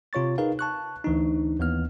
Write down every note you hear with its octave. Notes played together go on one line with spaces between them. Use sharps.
C3 F4 C#5 C#6 A6
D#4 G#4 A#4 B4 F5
A5 C#6 F#6
D2 E3 D4 D#4
D#2 E3 B3 F6